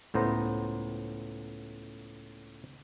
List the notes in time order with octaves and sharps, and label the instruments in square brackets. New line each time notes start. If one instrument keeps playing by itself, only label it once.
[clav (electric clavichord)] C#2 A2 B3 C5 A#5